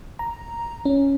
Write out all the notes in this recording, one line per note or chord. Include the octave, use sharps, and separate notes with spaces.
A#5
C#4